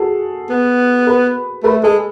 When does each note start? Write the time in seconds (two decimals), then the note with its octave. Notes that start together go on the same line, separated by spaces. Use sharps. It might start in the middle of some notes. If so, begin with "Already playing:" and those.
Already playing: F#4 G#4 A4
0.49 B3
1.07 B4
1.63 A3 B4
1.83 G#3 A4